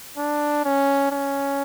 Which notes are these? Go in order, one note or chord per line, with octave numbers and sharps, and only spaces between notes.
D4
C#4
C#4